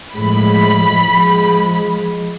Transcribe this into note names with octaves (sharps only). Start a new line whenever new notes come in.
A2 F3 G#3 B5
F3 G#3